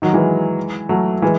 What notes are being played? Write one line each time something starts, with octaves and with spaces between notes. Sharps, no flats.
D#3 F#3
E3 G#3
F#3 A3
E3 G#3